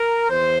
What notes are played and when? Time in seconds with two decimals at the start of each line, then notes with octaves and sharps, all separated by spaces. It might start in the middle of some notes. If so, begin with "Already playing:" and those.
Already playing: A#4
0.30 E2 C5